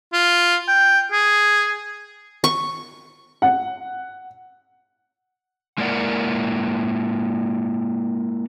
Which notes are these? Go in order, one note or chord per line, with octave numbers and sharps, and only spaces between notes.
F4
G5
G#4
C#6
F#5
G#3 A#3 E4 A#4 D5 F#5